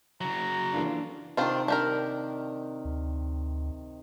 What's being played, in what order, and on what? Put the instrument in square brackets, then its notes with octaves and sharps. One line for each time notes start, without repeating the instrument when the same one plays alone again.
[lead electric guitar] C#3 F#3 [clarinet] A#5
[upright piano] E3 A#3 A4 [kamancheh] D4 F4
[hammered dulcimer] C3 D#3 [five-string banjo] C4 D4 F4
[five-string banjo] D4 G4 A#4
[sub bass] D2